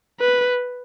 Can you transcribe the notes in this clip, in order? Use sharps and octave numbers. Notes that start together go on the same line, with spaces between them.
B4